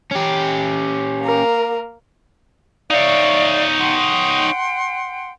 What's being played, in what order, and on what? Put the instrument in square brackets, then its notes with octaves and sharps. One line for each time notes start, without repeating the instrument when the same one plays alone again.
[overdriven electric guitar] C#4 G4
[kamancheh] A#3 A#4
[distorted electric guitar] D#4 C#5 [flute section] D5 E5 F5
[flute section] F#5 G5 C6